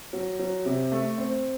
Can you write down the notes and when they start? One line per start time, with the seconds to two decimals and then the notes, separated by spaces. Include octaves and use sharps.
0.13 F#3
0.39 F#3
0.65 C3
0.92 A3
1.18 C4